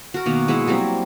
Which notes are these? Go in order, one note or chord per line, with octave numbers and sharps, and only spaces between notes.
F#4 A#4
B2 D#3 A#3 A#5
G#3 E4 E5 F#5
F#3 G3 A#3 C4